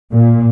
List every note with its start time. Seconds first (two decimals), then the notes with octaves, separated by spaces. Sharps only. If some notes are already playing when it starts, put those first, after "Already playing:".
0.12 A#2